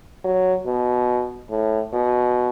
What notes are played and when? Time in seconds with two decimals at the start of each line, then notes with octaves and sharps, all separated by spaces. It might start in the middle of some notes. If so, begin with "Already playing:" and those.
0.24 F#3
0.66 B2
1.50 A2
1.93 B2